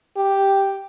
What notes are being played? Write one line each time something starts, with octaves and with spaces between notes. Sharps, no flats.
G4